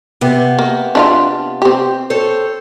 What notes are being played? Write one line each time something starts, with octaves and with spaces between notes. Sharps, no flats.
C3 B3
A#3
D4 E4 F4
C4 G4
A4 C5 C#5